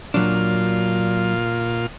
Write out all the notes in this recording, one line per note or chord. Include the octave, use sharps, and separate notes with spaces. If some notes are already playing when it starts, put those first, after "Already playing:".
A#2 F#3 D4 F4